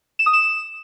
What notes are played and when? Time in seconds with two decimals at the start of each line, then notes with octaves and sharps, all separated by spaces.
0.19 E7
0.26 D#6
0.33 E7